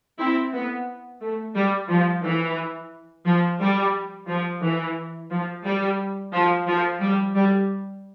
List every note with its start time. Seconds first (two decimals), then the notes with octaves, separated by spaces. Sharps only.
0.19 C4 E4
0.53 B3
1.21 A3
1.55 G3
1.89 F3
2.24 E3
3.26 F3
3.60 G3
4.28 F3
4.62 E3
5.31 F3
5.65 G3
6.33 F3
6.67 F3
7.01 G3
7.35 G3